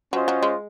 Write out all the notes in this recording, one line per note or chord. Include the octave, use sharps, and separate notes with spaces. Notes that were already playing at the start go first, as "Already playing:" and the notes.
F#3 C#4 F4 C5 D#5
F#3
G#3